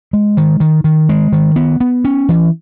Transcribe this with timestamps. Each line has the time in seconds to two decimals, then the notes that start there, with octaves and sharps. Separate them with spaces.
0.13 G#3
0.37 D#3
0.60 D#3
0.84 D#3
1.09 G#3
1.33 D#3
1.56 B3
1.80 B3
2.05 C#4
2.29 E3